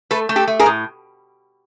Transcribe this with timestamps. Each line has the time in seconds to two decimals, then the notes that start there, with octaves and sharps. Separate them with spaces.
0.11 A3 A4 B4
0.29 A3
0.36 G4 A4
0.47 A3
0.59 G#4 A#4
0.66 A2